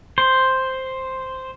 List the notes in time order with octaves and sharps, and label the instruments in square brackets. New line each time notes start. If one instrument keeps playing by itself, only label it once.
[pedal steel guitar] C5